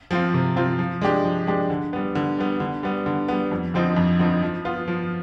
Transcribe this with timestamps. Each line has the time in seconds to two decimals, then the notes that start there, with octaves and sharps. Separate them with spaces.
0.11 F3 C4 F4
0.34 C3
0.56 F3 C4 F4
0.79 F3
1.02 G#3 D4 G4
1.24 F3
1.47 G#3 D4 G4
1.70 D3
1.93 G3 B3
2.15 D3
2.38 G3 B3
2.60 D3
2.83 G3 B3
3.06 D3
3.28 G3 B3
3.51 F2
3.74 D3 F3 C4 D#4
3.97 F2
4.19 D3 F3 C4 D#4
4.42 F3
4.65 B3 F4
4.88 F3